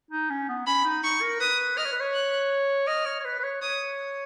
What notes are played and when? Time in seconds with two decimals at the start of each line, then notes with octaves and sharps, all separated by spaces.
0.11 D#4
0.30 C#4
0.49 B3
0.67 C#4 B5
0.85 D#4
1.04 D#4 C#6
1.21 A#4
1.40 B4 D#6
1.77 D#5 F6
1.85 C#5
1.92 B4
2.01 C#5
2.14 F#6
2.87 D#5 F6
3.06 C#5
3.20 C#5
3.25 B4
3.39 B4
3.44 C#5
3.62 C#5 D#6